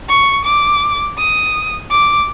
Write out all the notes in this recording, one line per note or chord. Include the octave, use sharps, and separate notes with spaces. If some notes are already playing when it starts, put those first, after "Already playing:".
C#6
D6
D#6
D6